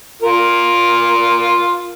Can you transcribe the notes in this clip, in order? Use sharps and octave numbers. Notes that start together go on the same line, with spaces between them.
F4 A#4